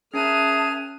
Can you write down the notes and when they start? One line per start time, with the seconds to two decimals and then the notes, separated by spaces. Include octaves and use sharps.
0.14 C#4 G#4 A#4 E5 A5 F6 F#6 D#7